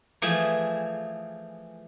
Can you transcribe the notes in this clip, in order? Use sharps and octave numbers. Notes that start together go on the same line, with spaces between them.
E3 F3 A3 G#4